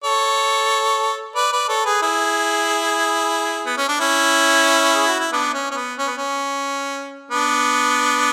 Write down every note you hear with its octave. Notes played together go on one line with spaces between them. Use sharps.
A4 C#5
B4 D5
B4 D5
A4 C#5
G#4 B4
E4 G#4
B3
C#4
D4
C#4 E4
G#4
F#4
E4
B3 D4
C#4
C#4
B3
C#4
B3
C#4
B3 D4